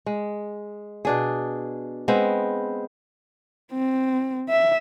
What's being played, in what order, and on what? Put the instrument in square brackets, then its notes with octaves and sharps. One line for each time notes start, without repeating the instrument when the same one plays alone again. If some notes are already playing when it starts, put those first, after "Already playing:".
[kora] G#3
B2 D4 G#4
G#3 B3 C4
[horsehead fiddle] C4
E5